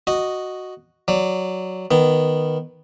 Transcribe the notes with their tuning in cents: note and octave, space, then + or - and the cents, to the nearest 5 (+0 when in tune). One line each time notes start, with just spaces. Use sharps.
F#4 +0 D#5 -5
F#3 +0 D5 +0
D#3 -5 B3 +0